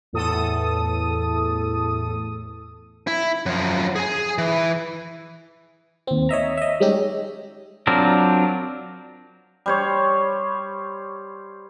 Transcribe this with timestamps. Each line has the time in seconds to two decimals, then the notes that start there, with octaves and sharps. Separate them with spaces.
0.13 E2 A2 A4 D#6
3.07 E4
3.46 F#2 F3
3.96 G#4 G#5
4.38 E3
6.07 D#2 C4
6.29 C#5 D#5 E5 A#5
6.57 D#5 E5
6.80 G3 G#3 C#4 D#4 G4
7.87 F#3 C4 D4 F4 A#4
9.66 G3 C5 C#5